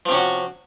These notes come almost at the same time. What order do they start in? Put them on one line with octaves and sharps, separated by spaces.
F3 C3 C#4 F#4